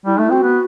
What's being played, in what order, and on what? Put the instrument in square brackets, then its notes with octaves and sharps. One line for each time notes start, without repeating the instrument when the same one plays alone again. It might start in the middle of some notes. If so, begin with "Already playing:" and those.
[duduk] G3 [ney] E4
[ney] D#4
[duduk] A3
[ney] E4
[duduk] C4 [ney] F#4
[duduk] B3